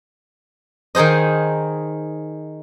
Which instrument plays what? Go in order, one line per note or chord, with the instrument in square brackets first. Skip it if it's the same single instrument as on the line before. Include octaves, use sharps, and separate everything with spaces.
[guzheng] D#3 D#4 G#4 C5 D#5